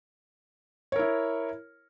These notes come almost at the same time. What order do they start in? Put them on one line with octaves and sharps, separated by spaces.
C#5 A#4 E4